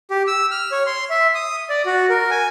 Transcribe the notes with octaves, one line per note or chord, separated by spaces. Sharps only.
G4
E6
F6
C#5
C6
E5
D#6
D5
F#4
A#4
G#5